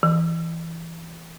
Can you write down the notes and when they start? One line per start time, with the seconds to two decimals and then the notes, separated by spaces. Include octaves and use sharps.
0.03 E3